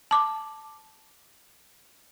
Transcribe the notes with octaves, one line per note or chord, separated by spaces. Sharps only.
A5 D6